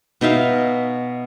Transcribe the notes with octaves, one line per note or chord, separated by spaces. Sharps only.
B2 D#4 E5 F5